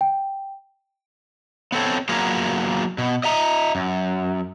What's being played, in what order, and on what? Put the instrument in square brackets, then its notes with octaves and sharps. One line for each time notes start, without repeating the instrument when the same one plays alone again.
[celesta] G5
[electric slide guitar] B3 C4 A4 C#5
F#3 A#3 B3 F4 G#4 A#4
B2
D#5 E5 A#5
F#2